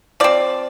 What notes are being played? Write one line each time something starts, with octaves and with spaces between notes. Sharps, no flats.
F3 C4 D5